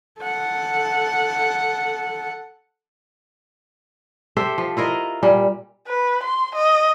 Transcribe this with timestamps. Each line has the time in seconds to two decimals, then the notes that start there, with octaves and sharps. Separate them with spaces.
0.21 A4 F#5
4.37 G4 A4 C5 E5
4.58 F3
4.77 E4 F4 A#4 D#5
5.23 A#2 G3
5.87 B4
6.23 C6
6.55 D#5